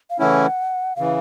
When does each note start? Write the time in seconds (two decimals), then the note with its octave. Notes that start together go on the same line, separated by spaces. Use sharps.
0.10 F5
0.20 C#3 E3 A3 C#4 E4 F#5
0.96 C#3 E3 F5